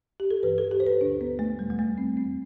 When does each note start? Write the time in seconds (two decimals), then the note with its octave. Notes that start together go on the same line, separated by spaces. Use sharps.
0.20 G4
0.31 A4
0.43 G2 E3 B4
0.58 A4
0.72 G4
0.80 C5
0.87 B4
1.01 D2 D3 D4
1.21 B3
1.39 A3
1.59 E2 B2 G3
1.70 G3
1.79 A3
1.98 C4
2.17 F2 E3 C4